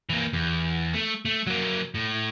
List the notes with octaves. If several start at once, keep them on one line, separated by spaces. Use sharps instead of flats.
E3 A#3
E2
A3
A3
F#3 A#3
A2